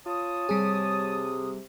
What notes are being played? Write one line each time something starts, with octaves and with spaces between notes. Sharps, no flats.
F4 C#5 A5 D#6
C3 G3 G#4